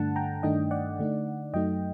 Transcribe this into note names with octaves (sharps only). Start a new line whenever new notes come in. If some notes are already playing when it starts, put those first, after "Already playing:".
Already playing: G2 D3 A3 D4 F#5 A5
G5 A#5
G2 D#3 A3 D4 D#5 G5
D5 F#5
D3 A3 D#4
F#2 F#3 A3 D#4 D#5 G5